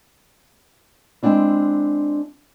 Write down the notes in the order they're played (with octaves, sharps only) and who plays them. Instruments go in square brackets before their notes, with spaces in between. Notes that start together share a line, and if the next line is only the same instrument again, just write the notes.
[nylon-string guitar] G#3 A#3 C4 D4 E4